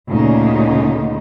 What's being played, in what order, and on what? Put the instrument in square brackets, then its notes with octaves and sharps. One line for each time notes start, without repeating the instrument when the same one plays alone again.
[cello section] D2 A#2 C#3 D#4